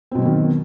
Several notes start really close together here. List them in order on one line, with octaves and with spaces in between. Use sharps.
C4 B2 F#3 B3 D#3